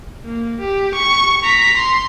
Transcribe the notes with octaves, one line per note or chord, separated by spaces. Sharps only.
A#3
G4
C#6
A#5 B6
C6